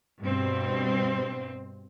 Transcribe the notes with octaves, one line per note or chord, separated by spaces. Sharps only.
G2 B2 C4